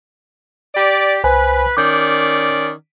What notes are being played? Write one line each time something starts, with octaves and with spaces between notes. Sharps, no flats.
G4 D5
C2 B4 C5 G#5
D#3 C#4 D5 D6 G6